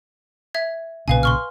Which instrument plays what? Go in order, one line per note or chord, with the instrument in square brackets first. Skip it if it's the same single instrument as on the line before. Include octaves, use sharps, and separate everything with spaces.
[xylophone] E5 G#6
[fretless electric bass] B1 A#2 C#3 [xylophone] B4 F5 G#5
[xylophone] C6 C#6 F6